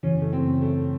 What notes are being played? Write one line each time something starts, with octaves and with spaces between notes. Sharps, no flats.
F#2 C#3 E3 C#4
A3
C4
A3